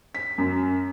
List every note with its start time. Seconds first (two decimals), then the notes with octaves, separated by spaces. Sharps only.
0.15 B6
0.38 F#2